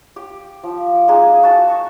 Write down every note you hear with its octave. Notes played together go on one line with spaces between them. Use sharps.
G4
F3
G#3 A#3 D#4 G#4
F#4 A5
C#6